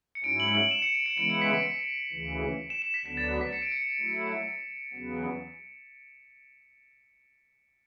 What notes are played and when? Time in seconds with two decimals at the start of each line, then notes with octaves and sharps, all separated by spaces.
0.15 C#7
0.24 G#2 F#3 C#4 E4 D7
0.40 F#7
0.55 F#7
0.71 E7
0.82 C#7
0.94 D7
1.06 C#7
1.18 C#3 E3 G#3 B3 E4 D7
1.30 C#7
1.42 B6
1.53 D7
2.12 D2 C#3 E3
2.70 E7
2.82 E7
2.94 B6
3.05 D2 D3 F#3 B3 D4 B6
3.17 A6
3.29 A6
3.41 B6
3.52 C#7
3.62 D7
3.72 C#7
4.00 F#3 A3 E4
4.93 E2 C#3 F#3 B3